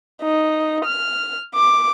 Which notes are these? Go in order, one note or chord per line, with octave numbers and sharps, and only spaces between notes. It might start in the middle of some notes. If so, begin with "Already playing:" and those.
D#4
F6
D6